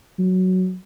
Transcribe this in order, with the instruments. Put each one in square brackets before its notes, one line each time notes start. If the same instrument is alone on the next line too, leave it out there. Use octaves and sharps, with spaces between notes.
[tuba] F#3